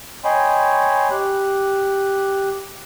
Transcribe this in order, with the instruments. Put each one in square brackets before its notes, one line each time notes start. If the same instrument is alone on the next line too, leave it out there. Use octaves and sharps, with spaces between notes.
[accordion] C#5 D#5 G5 G#5 B5 C6
G4 F#6